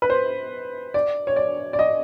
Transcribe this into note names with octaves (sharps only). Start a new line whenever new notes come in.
B4
C5
D5
C#5
D5
D5
D#5